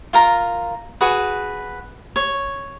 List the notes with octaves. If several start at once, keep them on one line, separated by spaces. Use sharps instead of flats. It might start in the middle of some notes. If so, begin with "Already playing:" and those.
F4 A#4 A#5
F#4 G#4 B4
C#5